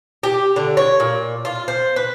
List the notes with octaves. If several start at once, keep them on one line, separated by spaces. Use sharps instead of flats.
G4
D3
C#5
A#2
F4
C5
B4